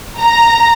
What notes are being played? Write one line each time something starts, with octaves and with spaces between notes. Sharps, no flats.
A#5